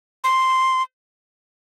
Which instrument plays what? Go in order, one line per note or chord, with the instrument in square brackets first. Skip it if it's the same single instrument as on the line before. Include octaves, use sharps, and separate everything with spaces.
[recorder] C6